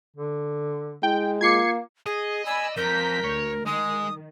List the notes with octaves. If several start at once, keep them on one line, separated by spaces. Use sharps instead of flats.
D3
G#3 E4 G5
A#3 F4 D6 G#6 C7 C#7
G#4 D#5
D5 G#5 B5 E6
F2 A#4 A#5 G6 B6
D2 C#5
D#3 G#3 D#6